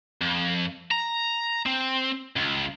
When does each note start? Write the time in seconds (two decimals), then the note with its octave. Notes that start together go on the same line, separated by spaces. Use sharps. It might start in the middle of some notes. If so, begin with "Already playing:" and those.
0.21 F2
0.91 A#5
1.66 C4
2.36 C#2